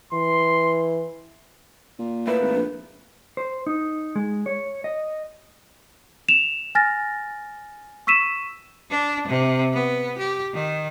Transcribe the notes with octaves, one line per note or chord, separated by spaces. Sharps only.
E3 C6
A#2
A3 A#3 E4 B4
G#1
A#1
C5
D#4
G#3
C#5
D#5
E7 F7
G#5 F6 A6 A#6
C#6 E6 B6 D#7 E7
D4
C3
B3
G4
D#3